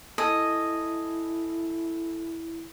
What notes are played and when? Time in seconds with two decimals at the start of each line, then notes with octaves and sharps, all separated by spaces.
0.18 E4 A4 D#5 G#5